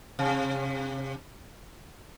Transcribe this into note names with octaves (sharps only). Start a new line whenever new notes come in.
C3